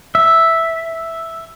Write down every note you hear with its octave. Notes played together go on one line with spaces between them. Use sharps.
E5